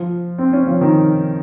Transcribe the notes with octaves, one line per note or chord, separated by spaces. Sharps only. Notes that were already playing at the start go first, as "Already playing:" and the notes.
Already playing: F3
C4
C#4
F3
D#3